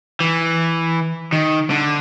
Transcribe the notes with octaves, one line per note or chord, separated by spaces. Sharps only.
E3
D#3
D3